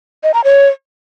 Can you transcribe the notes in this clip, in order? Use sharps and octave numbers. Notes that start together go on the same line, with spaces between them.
D#5
A#5
C#5